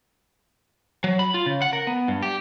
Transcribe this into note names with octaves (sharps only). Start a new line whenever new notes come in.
F#3
B5
F4
C#3
F#5
A#4
B3
G2
G4